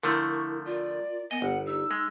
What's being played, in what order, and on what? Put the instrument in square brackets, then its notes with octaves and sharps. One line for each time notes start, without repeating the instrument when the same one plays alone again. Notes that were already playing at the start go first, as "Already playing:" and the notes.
[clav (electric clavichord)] D3 F3 A3 [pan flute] E4 [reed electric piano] A#4 [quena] C#6
[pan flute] F4 [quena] D5
[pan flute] B3 [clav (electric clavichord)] D#5 [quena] G#5
[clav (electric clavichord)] G1 [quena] F#5
[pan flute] D#4 [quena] E6
[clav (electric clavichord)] G#3